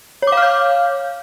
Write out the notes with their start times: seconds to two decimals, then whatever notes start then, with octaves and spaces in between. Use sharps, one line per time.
0.22 C#5
0.27 D6
0.32 F5
0.37 F6
0.42 G6